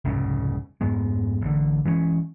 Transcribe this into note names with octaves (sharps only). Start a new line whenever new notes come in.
F1 C2 G#2 C#3
F2 G#2 G#3 B3
A1 D3
E3 G#3 A#3 C#4